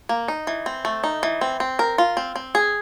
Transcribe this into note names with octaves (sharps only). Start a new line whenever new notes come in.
A#3
D#4
E3
C4
A3
D#4
E3
C4
C4
A#4
F4
C4
C4
G#4